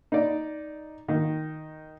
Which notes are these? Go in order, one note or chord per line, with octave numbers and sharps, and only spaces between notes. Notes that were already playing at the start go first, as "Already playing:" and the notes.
D#4 D5
D#3